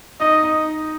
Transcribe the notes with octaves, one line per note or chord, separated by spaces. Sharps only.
D#4 D#5
D#4